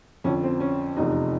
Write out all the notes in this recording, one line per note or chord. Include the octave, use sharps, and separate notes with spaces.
F2 D3 F3 C#4
C4
C#4
F1 E2 C3 F3 D#4